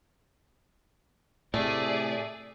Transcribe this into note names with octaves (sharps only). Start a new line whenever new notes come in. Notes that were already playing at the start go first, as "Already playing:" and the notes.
A2 C3 A3 G#4 D5